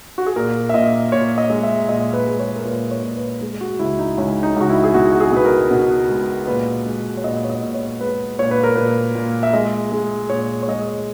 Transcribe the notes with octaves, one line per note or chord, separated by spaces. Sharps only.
F#4
G#4
A#2 A#4
E5
A#2 D#5
A#2 C#5
D#5
G#3
E5
A#2 D#5
B4
G#3
C#5
A#4
A#2 B4
C#5
A#2
B4
G#3 G#4
F#4
C#2 E4
D#4
C#2 C#4
D#4
C#2 F#4
E4
G#4
B2 F#4
F#4
G#4
B2 B4
A#4
B2
G#3
A#2 B4
G#3
C#5
A#2 D#5
C#5
D#5
A#2
C#5
G#3 B4
A#2 C#5
B4
A#4
A#2 B4
A#2
E5
G#3 D#5
G#3
A#2 C#5
C#5
G#3 D#5